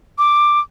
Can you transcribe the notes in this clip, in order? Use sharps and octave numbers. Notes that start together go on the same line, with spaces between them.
D6